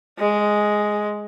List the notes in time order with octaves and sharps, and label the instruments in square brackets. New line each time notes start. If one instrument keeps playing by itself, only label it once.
[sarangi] G#3